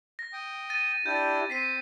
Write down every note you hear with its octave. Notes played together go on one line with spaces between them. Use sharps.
A#6
G5 D#6
A6 D#7
D4 E4 G4 G6 A6
C4 B6 C7 D#7